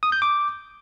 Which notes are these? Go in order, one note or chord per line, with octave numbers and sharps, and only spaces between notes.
D#6
G6
D6